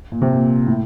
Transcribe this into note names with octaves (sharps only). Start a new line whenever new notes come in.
A#2
C3
A#2
A2